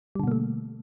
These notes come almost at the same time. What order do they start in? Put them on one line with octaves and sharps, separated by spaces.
G3 D3 B2 A#3 A3